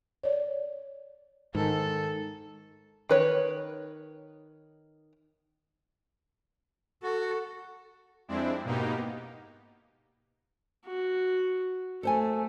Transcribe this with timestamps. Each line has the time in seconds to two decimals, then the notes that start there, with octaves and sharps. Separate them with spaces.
0.23 C#5 D5
1.55 G#2 D#3 A4
3.09 D#3 B4 C#5
7.03 F#4 A4
8.28 F2 G#3 C4 D4 E4
8.64 G#2 B2 A#3 B3 D#4 G4
10.86 F#4
12.03 A3 A4 C5 G#5